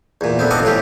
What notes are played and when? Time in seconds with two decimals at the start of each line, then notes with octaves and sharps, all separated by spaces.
0.21 E2 A#2
0.39 D3 B3 C4
0.51 C4 A4 D5 D#5 F#5
0.63 A1 F2 E3 F4 G4